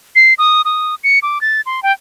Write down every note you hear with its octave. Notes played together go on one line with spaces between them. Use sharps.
C7
D#6
D#6
C#7
D6
A6
C6
G5